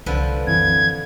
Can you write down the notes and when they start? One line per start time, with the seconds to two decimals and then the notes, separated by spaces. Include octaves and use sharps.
0.06 C2 D3 F3 B4
0.47 F#2 E3 C4 G#6